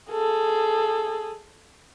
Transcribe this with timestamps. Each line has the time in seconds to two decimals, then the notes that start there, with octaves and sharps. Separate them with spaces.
0.11 G#4 A4